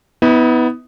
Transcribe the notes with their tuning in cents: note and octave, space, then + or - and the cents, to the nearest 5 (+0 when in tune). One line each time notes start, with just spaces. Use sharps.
B3 +10 E4 -40